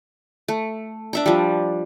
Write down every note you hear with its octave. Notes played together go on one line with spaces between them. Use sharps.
A3
D4 E5 A#5
F3 G3